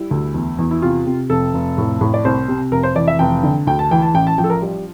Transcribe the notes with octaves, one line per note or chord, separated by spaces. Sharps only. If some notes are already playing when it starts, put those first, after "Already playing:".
Already playing: G3 E4
D2
E2
E2
E4
C3 F4
C3
F1 A4
F1
A2
A2
D5
C2 C5
C3
F1 A#4
C5
E3 D5
E5
F1 G5
D3
D2 G5
A5
E3 G5
A5
A1 G5
A5
F3 G5
A4
A#4
G3